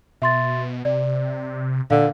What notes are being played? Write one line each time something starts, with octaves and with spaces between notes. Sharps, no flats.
B2 E5 C6 A6
C3 D5
A#2 D3 F5